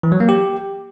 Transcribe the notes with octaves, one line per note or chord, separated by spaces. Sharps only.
E3
F#3
A#3
G4